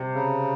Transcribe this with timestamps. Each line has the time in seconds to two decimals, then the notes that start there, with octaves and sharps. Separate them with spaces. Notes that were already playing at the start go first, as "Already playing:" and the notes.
Already playing: C3
0.14 C#3